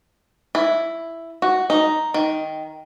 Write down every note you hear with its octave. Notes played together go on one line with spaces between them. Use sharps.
E4
F#4
D#4
D#3